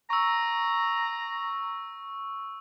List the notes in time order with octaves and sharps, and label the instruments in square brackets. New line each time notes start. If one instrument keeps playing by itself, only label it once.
[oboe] A#5 [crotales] C#6 E6